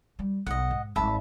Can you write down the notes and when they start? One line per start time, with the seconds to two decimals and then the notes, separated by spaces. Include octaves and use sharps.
0.19 G3
0.46 B1 D#5 F#5
0.71 G#2
0.96 G#1 G#2 E5 A5 B5